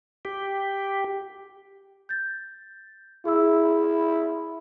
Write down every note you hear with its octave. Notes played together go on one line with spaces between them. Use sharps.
G4
G6 A6
E4 G#4 E6